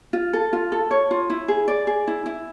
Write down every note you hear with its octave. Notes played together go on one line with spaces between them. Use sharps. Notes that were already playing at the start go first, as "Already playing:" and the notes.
F4
A4
F4
A4
C#5
F4
E4
G#4
D5
G#4
E4
E4